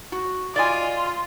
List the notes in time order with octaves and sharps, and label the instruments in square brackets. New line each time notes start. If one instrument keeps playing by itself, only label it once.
[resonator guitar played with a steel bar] F#4
[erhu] F4 [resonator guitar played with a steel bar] D5 D#5 G#5